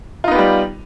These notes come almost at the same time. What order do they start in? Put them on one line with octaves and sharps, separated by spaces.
F4 D#4 B3 G4 G3